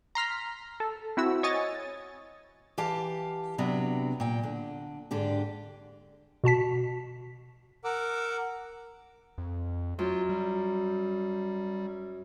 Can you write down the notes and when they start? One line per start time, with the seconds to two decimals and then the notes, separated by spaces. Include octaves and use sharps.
0.15 A#5 C6 F6 B6
0.80 A4
1.17 C4 E4 F#4 E6
1.43 C#5 D#5 G#5 C#6 D#6 A6
2.78 E3 G4 F5 A5
3.58 C3 F#3 B3 D4
4.20 A#2 G5
4.43 D3
5.11 G#2 D3 D4 G4
6.44 B2 F#4 A5 B6
7.84 A#4 F#5 D6 E6
9.38 F2
9.99 F#2 F4
10.29 G3